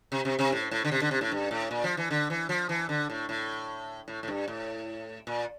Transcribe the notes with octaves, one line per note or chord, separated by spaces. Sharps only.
C3
C3
C3
A2
A2
D3
C3
D3
C3
A2
G2
A2
A#2
F3
E3
D3
E3
F3
E3
D3
A2
A2
A2
A2
G2
A2
A#2